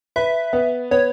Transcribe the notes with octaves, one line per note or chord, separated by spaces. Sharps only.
B4 E5
B3
B3 C#5